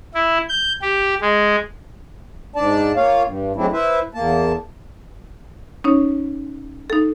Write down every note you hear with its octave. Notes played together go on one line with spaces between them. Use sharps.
E4
G6
G4
G#3
G#2 D4 D5 A5
A#3 F4 C#5 F5
G2
F#3 G#3 A3 C4 D4 E4
E4 B4 C5 E5
E2 A#3 A5
C#4 D#4 C#5
D#4 A4